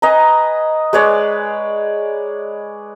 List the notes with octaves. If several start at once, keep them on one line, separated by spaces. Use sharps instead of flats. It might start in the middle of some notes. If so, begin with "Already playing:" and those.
B4 D#5 G#5 A#5
G#3 B4 C#5 D5